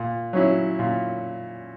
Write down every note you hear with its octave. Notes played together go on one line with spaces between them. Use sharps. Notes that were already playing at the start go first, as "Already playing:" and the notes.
Already playing: A#2
F#3 C#4 E4
A#2